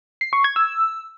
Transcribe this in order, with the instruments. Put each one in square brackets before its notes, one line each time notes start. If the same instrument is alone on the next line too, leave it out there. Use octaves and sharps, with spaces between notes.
[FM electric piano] C7
C#6
G#6
E6